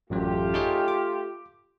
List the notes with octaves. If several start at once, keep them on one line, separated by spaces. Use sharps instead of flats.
A1 F#2 F#3 A3 F4 G4
D#4 G#4 C#5
D6